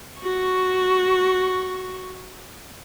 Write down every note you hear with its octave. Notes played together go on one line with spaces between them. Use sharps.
F#4 C#6